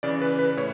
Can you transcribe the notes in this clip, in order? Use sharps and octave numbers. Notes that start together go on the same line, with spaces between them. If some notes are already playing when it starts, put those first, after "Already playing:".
C#3 E3 D5
B4
B4
A2 C#5